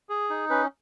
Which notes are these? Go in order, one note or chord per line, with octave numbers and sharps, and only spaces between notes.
G#4
D#4
C#4 B4